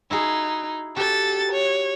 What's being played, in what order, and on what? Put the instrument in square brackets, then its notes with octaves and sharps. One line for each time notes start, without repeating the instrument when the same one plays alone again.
[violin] D#4 [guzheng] E4 F#4 G#4
[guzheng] F#4 G4 [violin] A4 A6
[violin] C#5